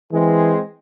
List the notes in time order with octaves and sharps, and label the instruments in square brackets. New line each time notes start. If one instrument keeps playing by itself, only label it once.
[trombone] E3 [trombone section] G#3 C4 G#4